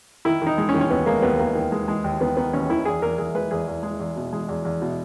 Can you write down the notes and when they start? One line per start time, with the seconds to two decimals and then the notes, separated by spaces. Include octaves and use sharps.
0.25 D#3 E4
0.42 D#3 D#4
0.58 G#3
0.69 C#4
0.74 D#3
0.81 C#4
0.90 D#2 B3
1.06 G#3 A#3
1.22 D#2 B3
1.39 D#3 A#3
1.55 D#3
1.72 G#3
1.88 G#3
2.04 D#2
2.20 D#3 B3
2.37 D#3 B3
2.53 D#2 C#4
2.69 D#3 E4
2.85 E2 G#4
3.02 E2 A#4
3.18 E2 G#4
3.34 G#3 B4
3.51 E2 G#4
3.67 E2
3.83 G#3
4.00 E2
4.17 B2
4.33 G#3
4.48 E2
4.65 E2
4.82 B2